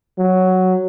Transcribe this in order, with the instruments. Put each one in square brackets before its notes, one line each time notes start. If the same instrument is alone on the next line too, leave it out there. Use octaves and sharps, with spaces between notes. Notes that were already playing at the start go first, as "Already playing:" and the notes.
[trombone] F#3